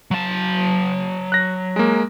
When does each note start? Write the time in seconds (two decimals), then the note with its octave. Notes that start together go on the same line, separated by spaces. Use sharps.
0.11 F#3 A5
1.32 F#6 A#6
1.76 G#3 A#3